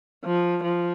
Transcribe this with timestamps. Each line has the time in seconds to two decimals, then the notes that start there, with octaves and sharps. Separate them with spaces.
0.25 F3
0.63 F3